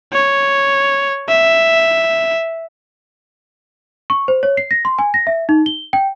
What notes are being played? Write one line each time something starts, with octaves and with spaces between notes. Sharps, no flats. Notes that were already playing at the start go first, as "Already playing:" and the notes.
C#5
E5
C#6
C5
C#5
C7
A#6
C6
G#5
A#6
E5
D#4
G7
G5